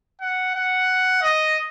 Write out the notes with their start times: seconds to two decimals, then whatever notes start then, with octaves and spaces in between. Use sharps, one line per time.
0.21 F#5
0.56 F#5
1.22 D#5